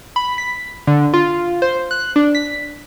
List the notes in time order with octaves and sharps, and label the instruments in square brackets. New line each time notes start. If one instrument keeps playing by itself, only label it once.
[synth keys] B5
B6
D3
F4
C5
F#6
D4
B6